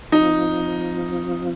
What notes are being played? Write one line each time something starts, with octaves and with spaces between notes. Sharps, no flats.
F3 C4 D#4 F4